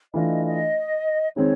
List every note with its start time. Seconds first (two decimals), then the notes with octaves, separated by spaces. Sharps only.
0.14 E3 A3 D4 F4 D#5
0.45 D#5
1.36 D#3 G#3 C4 C#5